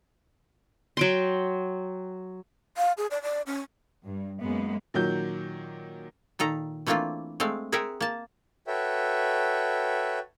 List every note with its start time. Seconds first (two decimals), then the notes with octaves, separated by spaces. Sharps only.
0.97 F#3 G5 C6
2.77 F5
2.97 G#4
3.11 D5
3.22 D5
3.46 C#4
4.04 G2
4.41 F#2 G#3 A#3 B3
4.94 A#2 D#3 F#3 G6
6.39 A#2 D#3 A4 A#5
6.87 E3 A3 A#3 C4 D4 F4
7.40 G#3 A3 C4 F5
7.72 G#4 A#4 C5 E5 F#5 G5
8.01 A#3 A5
8.67 F#4 A4 B4 C#5 E5 G5